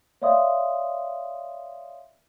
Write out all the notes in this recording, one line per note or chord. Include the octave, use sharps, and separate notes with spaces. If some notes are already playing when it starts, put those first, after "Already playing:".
C#5 D5 E5 F5 C6 D#6